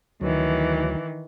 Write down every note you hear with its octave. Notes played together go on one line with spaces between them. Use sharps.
D2 D#3 E3 F#3